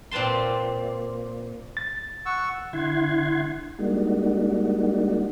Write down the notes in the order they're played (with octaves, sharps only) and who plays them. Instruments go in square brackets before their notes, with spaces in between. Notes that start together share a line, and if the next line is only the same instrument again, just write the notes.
[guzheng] A#2 C4 B4 A5 C6
[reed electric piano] A6
[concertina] F#5 C#6 E6
[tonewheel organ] D3 E4 F#5 C6 G#6
G3 G#3 A#3 D4 D#4 F#4